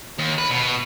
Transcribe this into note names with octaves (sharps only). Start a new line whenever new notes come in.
D#2
B4
B2